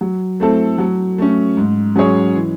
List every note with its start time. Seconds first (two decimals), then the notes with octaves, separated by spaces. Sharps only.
0.01 F#3
0.40 A3 C4 E4 A4
0.78 F#3
1.18 A3 C#4
1.57 G#2
1.96 F#3 C#4 G#4 C#5
2.35 E3